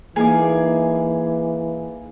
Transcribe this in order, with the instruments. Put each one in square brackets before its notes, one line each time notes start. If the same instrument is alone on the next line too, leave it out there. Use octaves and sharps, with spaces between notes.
[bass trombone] E3 [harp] A#3 D#4 D6 [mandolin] G#4